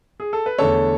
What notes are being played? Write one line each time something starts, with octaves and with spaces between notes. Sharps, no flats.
G#4
A4
B4
E2 D3 A3 D4 A4 C#5